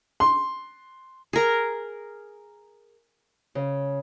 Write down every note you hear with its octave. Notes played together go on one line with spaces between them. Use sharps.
C6
G#4 A#4
C#3